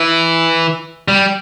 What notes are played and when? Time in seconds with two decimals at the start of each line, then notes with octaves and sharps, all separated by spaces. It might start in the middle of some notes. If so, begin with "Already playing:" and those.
Already playing: E3
1.08 G3